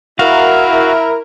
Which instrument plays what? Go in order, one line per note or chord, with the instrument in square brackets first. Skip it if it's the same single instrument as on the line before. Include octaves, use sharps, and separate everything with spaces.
[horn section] E4 A#4 [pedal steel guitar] F#4 F5